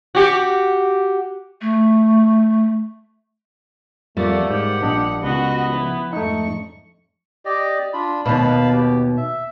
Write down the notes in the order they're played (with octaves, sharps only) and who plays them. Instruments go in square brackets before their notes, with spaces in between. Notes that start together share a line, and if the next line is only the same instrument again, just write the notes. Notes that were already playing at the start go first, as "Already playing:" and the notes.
[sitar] F#4 G4
[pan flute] A3
[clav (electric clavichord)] F2 [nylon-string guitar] G3 A#3 [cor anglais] A3 [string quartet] D5 F#5
[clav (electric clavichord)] G#2 [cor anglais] G4 [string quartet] F#5
[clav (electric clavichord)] A#1 D4 D#5
[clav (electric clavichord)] C#2 [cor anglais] B3 [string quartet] F#4 D#5
[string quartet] F3 E4
[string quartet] F2 G#2 C#6 [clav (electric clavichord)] A3 D#4
[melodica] G4 D5 D#5
D4 F4 B5
[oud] D#2 B2 [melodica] F5 A5 B5
[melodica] G4
E5